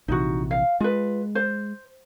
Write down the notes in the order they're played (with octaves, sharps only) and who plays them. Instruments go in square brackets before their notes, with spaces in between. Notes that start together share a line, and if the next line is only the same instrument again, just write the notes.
[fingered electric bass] A#1 C3 E3 [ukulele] D#4 F#4
[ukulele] F5
[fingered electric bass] G#3 [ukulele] F4 B4
[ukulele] C5